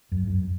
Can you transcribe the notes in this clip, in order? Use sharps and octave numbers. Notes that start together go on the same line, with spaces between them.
F#2
F#2